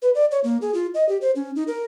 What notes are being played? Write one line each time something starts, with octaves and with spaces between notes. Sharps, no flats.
B4
D5
C#5
A#3
G#4
F4
D#5
G4
C5
C#4
D#4
A#4